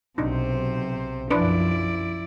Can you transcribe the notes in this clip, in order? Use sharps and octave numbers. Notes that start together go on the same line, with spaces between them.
B1 C3 D4 D#4 C5
F#2 F3 D4 E4 B4 D5